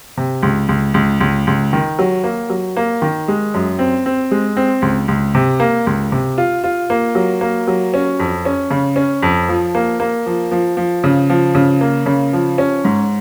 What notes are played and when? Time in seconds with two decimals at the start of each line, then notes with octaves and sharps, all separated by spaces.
0.17 C3
0.43 C#2
0.69 C#2
0.94 C#2
1.21 C#2
1.47 C#2
1.73 D#3
1.99 F#3
2.24 A#3
2.50 F#3
2.77 A#3
3.02 D#3
3.28 G#3
3.54 F#2
3.79 C4
4.06 C4
4.31 G#3
4.57 C4
4.82 C#2
5.08 C#2
5.35 C3
5.60 A#3
5.87 C#2
6.12 C3
6.38 F4
6.64 F4
6.90 A#3
7.15 F#3
7.41 A#3
7.67 F#3
7.94 C#4
8.20 F2
8.45 C#4
8.71 C#3
8.96 C#4
9.22 F2
9.49 F3
9.75 A#3
10.00 A#3
10.26 F3
10.51 F3
10.77 F3
11.04 C#3
11.30 F3
11.55 C#3
11.81 A#3
12.06 C#3
12.33 F3
12.58 C#4
12.85 G#2